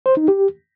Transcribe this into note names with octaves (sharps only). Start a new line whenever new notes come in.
C5
D#4
G4